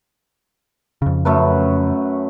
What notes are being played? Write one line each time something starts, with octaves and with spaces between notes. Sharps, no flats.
F2 C#3
F#2 A3 B4